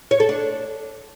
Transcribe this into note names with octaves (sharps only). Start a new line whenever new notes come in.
C#5
A4
D4